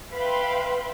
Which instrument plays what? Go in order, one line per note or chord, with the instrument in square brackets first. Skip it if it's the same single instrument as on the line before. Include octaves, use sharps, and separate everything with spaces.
[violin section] B4 E5 F5 G5 B5 C6